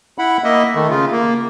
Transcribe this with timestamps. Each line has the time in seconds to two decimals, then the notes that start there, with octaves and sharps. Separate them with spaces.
0.18 E4 F#5 B5
0.44 A#3 D#5 E5
0.75 D#3 A3
0.90 C#3 F4
1.12 A#3